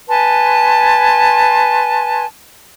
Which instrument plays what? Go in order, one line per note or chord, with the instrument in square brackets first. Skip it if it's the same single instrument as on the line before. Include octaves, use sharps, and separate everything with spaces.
[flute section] B4 G#5 A5 C6